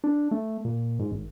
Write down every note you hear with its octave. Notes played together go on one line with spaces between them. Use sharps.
D4
A3
A#2
G#2
G#1